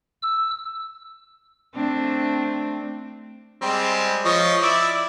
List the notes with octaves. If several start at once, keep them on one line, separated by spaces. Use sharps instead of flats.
E6
A3 C4 D4
G3 G#3 C4
F3 C#5 D#5
E4 D5 E5